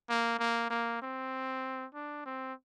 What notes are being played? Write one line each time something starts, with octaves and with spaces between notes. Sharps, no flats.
A#3
A#3
A#3
C4
D4
C4